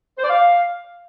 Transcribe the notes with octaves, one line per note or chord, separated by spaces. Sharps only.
C5
D5
F5